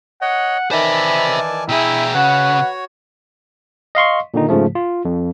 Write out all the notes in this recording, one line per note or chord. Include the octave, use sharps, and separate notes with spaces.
C#5 D#5 F#5
D#3 E3 C5 D5 E5 G#5 A5 B5
B2 E4 G#4 E5 G5 A#5
C#3 F#4 B4 C#5 F#5
D#5 F5 C6 C#6
A#2 D3 D#3 D#4
G#2 C#3 F3 A3
F4
F2